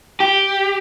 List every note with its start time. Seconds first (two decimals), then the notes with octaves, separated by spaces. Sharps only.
0.20 G4